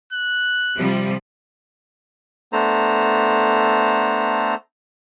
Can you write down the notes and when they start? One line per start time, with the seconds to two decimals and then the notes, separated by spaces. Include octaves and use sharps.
0.13 F#6
0.77 C3 F3 G3
2.52 A3 B3 D4 A4 C5 A#5